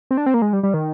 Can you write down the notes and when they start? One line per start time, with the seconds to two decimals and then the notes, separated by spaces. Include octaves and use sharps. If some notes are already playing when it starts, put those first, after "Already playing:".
0.11 C4
0.17 D4
0.26 C4
0.34 A#3
0.42 G#3
0.53 G3
0.63 G3
0.74 D#3